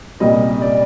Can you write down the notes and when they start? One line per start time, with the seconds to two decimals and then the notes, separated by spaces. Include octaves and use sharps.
0.20 C2 A#2 G3 A#3 D#5
0.62 D5